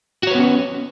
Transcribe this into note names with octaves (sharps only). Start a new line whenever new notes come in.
B3 C#4 F#4 B4 C#5